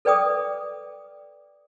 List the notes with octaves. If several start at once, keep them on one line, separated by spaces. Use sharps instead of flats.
A4 B4 D5 G5 D6 D#6